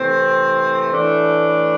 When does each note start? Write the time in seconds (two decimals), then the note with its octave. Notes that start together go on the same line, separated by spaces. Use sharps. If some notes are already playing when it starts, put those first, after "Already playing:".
Already playing: C3 E3 A3 C4
0.92 A2 E3 A3 D4